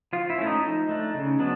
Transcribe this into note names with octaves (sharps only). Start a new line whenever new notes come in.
F3 F4
E4
A3 C#4
D#4
F3 D#4
A3 D4
C#3
F#3 B3 D4